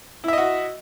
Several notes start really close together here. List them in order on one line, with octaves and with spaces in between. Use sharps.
E4 E5 D#5 F#4